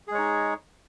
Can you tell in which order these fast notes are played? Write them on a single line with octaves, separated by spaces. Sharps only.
G#4 G#3 C#5 D#4